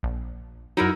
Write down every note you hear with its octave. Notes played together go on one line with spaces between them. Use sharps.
A#1
F#2 F#3 D#4 E4 A#4